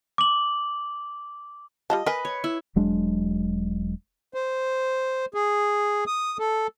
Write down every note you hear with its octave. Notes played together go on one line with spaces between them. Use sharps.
D6 F#7
G3 F4 D#5 A5
A#4 B4 D#5 G#5
C#5
E4
E1 F#3 G#3 D4
C5
G#4
D#6
A4